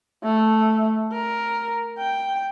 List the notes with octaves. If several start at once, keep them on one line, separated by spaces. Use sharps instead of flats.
A3
A#4
G5